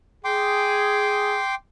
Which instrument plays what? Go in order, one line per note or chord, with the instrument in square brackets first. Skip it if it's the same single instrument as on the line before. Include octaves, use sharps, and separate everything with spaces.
[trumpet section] G#4 [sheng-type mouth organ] G5 C6 D6